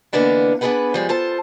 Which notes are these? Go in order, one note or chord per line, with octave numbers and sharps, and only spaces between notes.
D3 E3 A#3 B3 D4 D#4
B3 D4 F#4 G#4 B4 F#5
F3 G3 G#3
F4 A4 C5 A5